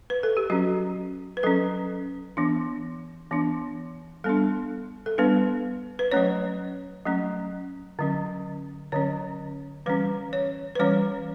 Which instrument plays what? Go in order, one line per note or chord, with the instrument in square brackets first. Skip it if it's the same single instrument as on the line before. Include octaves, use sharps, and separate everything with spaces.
[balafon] B4
A4
G4
F#3 C#4 F#4
B4
F#3 C#4 A4
E3 B3 D4
E3 B3 D4
G3 B3 D4 A4
A4
G3 B3 D4 B4
B4
F#3 A3 C#4 C#5
F#3 A3 C#4
D3 F#3 C#4
D3 F#3 C#4 C#5
E3 G3 C#4 B4
C#5
B4
E3 G3 C#4 C#5